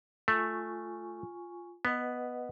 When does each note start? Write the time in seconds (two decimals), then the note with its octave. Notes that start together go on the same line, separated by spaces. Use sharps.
0.28 A3 F4 G#5 C#6
1.85 B3 B4 D#5 F#5